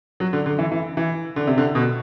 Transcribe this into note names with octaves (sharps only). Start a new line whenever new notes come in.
F#3
D3
D3
E3
E3
E3
D3
C3
D3
B2